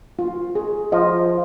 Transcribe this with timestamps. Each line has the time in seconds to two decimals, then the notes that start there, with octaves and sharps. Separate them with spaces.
0.19 F4
0.55 G#4
0.92 F3 D#5